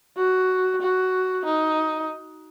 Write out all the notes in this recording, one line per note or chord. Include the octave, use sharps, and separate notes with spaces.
F#4
F#4
D#4